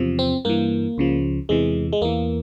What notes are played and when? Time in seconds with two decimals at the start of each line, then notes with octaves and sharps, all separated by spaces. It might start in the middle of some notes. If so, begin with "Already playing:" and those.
Already playing: E2 C3 F3
0.19 C4
0.45 G2 E3 A#3
0.98 C#2 C#3 F3
1.49 E2 C3 E3 G#3
1.93 G#3
2.01 E2 E3 A#3